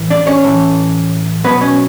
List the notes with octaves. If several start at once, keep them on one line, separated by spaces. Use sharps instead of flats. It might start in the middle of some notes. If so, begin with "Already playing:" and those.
Already playing: A2 E3
D4 D5
C#4 C#5
A2 E3
B2 F#3 B3 B4
C#4 C#5